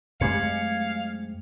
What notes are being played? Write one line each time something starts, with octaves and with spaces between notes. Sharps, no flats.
F#2 G#3 A3 C4 F5 G#6 C#7